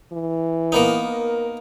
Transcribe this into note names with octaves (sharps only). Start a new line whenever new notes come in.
E3
A#3 B3 D#4 A#4